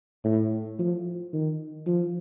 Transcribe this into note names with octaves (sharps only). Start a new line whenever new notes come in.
A2
F3
D#3
F3